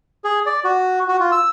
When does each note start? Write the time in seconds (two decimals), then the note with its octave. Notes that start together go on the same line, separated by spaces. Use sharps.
0.24 G#4
0.46 D5
0.64 F#4
1.08 F#4
1.20 F4
1.32 E6